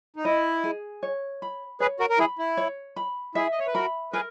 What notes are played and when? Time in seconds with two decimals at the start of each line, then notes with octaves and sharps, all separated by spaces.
0.16 D#4
0.24 E4 D#5
0.64 G#4
1.03 C#5
1.42 B5
1.80 G#4 B4 C#5
2.00 F#4 A#4
2.10 A#4
2.19 E4 G#4 B5
2.39 E4
2.57 C#5
2.96 B5
3.35 E4 G#4 E5
3.52 D#5
3.59 C#5
3.67 B4
3.74 F#4 A#4 B5
4.13 G#4 A#4 B4